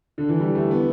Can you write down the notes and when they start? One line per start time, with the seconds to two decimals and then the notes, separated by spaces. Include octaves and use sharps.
0.18 D3
0.29 E3
0.39 G3
0.55 A3
0.71 B3